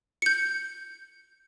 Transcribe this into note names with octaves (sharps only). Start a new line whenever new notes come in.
G6 C#7